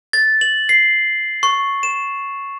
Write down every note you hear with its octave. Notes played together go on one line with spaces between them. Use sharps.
A6
F#7
C7
C#6
E7